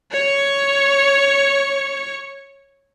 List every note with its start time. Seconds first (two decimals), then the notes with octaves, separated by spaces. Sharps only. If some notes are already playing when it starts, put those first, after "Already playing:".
0.12 C#5 C#6